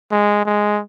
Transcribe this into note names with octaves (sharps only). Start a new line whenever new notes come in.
G#3
G#3